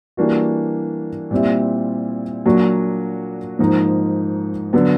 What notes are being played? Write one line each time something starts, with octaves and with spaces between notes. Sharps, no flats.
E3 G3 A#3 D4 F#4
A#2 G3 C4 E4
A#2 F#3 A#3 D4 F#4
G#2 F3 A#3 D#4
D3 F#3 B3